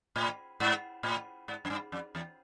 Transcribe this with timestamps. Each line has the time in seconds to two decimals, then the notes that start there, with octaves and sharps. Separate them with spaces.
0.16 A2
0.60 G#2
1.03 A2
1.48 G#2
1.65 F#2
1.70 G2
1.92 F2
2.15 E2